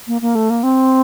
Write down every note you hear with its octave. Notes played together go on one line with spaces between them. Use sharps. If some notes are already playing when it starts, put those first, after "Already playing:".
A#3
A#3
A3
A#3
C4